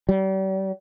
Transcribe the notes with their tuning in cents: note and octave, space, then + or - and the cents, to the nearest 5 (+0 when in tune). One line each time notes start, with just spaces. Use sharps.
G3 -40